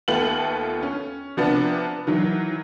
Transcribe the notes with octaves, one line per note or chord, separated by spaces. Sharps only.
D#2 A3 B3 F4 G5 F#7
C#4
C3 F3 B3 D4
D#3 E3 F#3